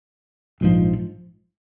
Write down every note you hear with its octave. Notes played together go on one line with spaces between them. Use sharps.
A#1 G#2 F3